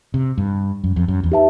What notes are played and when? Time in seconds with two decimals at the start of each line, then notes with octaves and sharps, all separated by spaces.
0.14 C3
0.38 G2
0.84 F#2
0.96 F2
1.08 F#2
1.23 E2
1.32 D#4 G4 B4 E5 A5